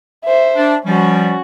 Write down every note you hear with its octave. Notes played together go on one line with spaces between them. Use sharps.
C5 E5
D4
F3 G3 C#4 F#4